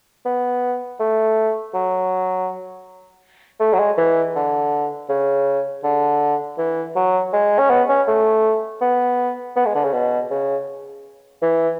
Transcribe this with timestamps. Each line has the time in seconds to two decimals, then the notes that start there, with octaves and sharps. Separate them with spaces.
0.25 B3
1.00 A3
1.74 F#3
3.60 A3
3.74 F#3
3.79 G#3
3.98 E3
4.36 D3
5.09 C#3
5.84 D3
6.58 E3
6.96 F#3
7.33 G#3
7.59 C#4
7.70 B3
7.89 C#4
8.08 A3
8.82 B3
9.56 B3
9.66 G#3
9.75 D3
9.84 C#3
9.93 B2
10.31 C#3
11.42 E3